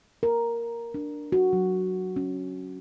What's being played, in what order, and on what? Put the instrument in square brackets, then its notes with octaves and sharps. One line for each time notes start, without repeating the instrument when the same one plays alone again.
[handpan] A#4
D4
F#4
F#3
C#4